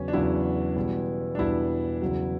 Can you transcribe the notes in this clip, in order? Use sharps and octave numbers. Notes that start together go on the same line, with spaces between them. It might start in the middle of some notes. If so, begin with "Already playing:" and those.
Already playing: E2 C#3 F#3 C#4
D4
E2 C#3 F#3 E4
E2 B2 G3
D4
E2 B2 G3 E4
E2 C#3 F#3